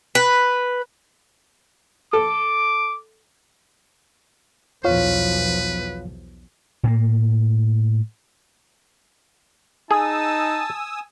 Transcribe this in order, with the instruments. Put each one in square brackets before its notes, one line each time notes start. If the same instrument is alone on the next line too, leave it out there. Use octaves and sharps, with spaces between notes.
[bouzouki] B4
[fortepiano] A4 [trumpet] D6
[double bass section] B1 E2 F3 [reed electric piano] F4 C#5 F5 [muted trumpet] B4
[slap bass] A2 A#3
[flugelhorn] D#4 [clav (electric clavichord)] G#4 [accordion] G#5 D#6 E6 [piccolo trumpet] A5